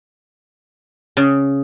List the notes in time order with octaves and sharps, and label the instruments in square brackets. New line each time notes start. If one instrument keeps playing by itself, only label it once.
[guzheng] C#3